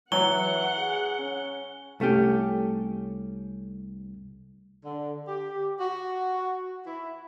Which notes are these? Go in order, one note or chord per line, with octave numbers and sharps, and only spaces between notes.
E3 F#3 F#5 G7
G#4
C#4
C2 A3 C#4 G4
D3
G4
F#4
E4